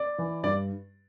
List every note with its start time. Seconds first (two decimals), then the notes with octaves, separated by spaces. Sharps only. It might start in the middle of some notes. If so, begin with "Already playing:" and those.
Already playing: D5
0.18 E3
0.43 G2 D5